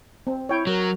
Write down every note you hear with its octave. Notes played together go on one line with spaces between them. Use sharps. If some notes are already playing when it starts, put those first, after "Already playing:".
C4
E4 C#5 G5
F#3 A#4